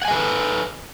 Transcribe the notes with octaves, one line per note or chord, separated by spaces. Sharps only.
A4 B4 D#5 F#5 G#5